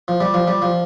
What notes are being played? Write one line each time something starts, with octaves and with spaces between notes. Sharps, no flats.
F3
G3
F3
G3
F3